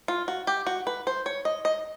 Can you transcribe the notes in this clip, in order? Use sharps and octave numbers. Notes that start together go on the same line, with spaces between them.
F4
F#4
G4
F#4
B4
C5
C#5
D#5
D#5